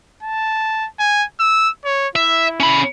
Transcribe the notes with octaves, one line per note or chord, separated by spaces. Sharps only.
A5
G#5
E6
C#5
E4 E5
C#4 B5